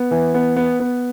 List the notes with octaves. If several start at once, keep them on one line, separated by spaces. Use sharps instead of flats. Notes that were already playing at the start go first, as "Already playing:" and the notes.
Already playing: B3
E3
B3
B3
B3